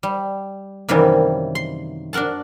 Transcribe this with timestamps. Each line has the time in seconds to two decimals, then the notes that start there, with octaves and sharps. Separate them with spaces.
0.03 G3
0.89 F#2 C3 D#3 E3 G3 A#3
1.55 C6
2.13 D4 F#4 A#4 F#5 A5